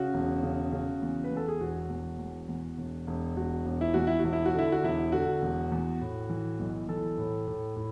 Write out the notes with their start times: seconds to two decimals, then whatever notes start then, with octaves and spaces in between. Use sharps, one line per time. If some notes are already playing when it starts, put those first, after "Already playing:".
Already playing: C#3 F#4
0.14 E1
0.43 C#3
0.72 C#3
1.02 E2
1.24 B4
1.31 E2
1.37 A4
1.48 G#4
1.60 E1 F#4
1.89 E1
2.19 E2
2.49 E2
2.78 E1
3.07 E1
3.36 E1 F#4
3.66 E1
3.81 E4
3.94 E2 F#4
4.07 E4
4.19 E1 F#4
4.33 E4
4.46 F#4
4.54 D3 E4
4.72 F#4
4.83 E1 E4
5.12 D3 F#4
5.42 E1
5.72 E2
6.01 A2
6.30 E3
6.59 B1
6.89 E3 A4
7.18 A2
7.47 A2
7.76 A2